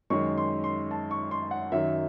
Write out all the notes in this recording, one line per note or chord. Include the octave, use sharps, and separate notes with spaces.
F#2 D#3 G#3 C#6
C6
C6
A5
C#6
C6
F#5
F#2 D#3 F#3 E5